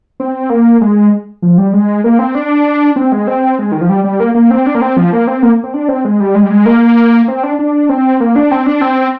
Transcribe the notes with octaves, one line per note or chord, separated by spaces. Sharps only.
C4
A#3
G#3
F3
G3
G#3
A#3
C4
D4
C4
G#3
C4
G#3
D#3
F3
G3
G3
A#3
A#3
C4
D4
A#3
C4
F3
A#3
C4
A#3
C4
D4
C4
G#3
G3
G#3
G3
G#3
A#3
C4
D4
D4
C4
A#3
D4
C4
D4
C4